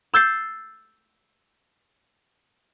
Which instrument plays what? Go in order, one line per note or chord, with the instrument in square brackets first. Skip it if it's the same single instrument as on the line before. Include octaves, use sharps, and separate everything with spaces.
[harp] E6 G6 A6 C7